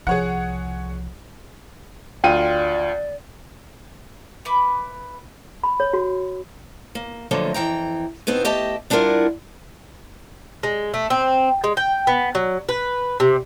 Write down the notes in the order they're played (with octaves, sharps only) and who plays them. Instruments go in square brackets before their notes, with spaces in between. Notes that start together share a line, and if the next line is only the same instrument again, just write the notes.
[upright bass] C2 F3 [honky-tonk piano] G#4 C#5 F#5
[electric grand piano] D2 F4 D#7 [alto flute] D5 [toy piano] G5
[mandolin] B4 E5 B5 D6
[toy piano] B5
C#5
F#4
[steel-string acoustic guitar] A#3
D3 F3 F#3 A3 A#3
F2 E3 G5 A#5
B2 D#3 B3 C4
A3 G4 D#5 G5 A5
G3 D4 E4 F4 A#4 F#5
[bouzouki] G#3
A3
C4
G#3
G5
B3
F#3
B4
C3